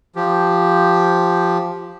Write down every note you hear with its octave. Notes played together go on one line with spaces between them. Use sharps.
F3 G4